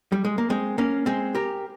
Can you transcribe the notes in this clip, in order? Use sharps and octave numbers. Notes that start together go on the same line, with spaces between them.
G3
G#3
A#3
G#3 C4
A#3 C#4
G#3 C4
G4 A#4